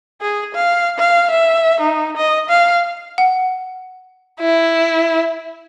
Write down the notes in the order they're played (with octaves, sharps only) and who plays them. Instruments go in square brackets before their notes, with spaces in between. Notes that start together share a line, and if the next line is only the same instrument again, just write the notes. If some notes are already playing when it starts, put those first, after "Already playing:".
[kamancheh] G#4
F5
F5
E5
D#4
D#5
F5
[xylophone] F#5
[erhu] E4